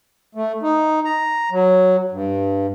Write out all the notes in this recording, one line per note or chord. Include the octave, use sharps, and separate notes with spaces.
A3
D#4
A#5
F#3
G2